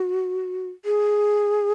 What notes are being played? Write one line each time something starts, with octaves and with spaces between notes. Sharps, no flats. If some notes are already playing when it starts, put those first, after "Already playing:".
Already playing: F#4
G#4